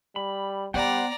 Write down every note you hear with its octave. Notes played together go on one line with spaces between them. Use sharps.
G3 B5
G3 B3 C5 D5 F#5 G5 A#5